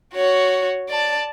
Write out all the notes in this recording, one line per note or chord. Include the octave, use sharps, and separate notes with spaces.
F#4 C#5
D5 A5